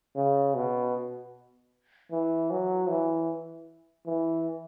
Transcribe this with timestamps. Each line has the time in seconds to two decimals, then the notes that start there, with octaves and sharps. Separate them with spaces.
0.16 C#3
0.55 B2
2.11 E3
2.50 F#3
2.89 E3
4.06 E3